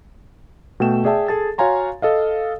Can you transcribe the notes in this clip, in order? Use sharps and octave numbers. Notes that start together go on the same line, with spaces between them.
B2 A3 G5 E7
G#4 D5 E5 G5 A5
G#4 A4 A5 A6
F#4 C#5 F5 G#5 A#5 C6
A4 D#5 F5